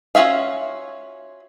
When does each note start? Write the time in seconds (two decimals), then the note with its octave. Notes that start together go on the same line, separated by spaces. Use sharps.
0.15 C#4 F4 F#4 E5 F5